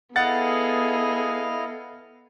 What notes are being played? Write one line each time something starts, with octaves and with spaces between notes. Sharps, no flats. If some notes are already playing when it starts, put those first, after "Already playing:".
B3 E4 G#4 A4 D#5 F5 F#5 A6